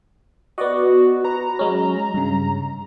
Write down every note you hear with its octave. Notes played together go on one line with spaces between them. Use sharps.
B3 F#4 D5 D#5
B4 A#5
F#3 G#3 C#4
G2 C#3